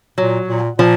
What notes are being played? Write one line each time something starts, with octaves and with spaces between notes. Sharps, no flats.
A#2 F#3
A#2
A#2 F3